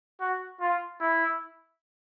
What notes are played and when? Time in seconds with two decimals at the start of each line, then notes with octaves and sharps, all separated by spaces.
0.21 F#4
0.61 F4
1.00 E4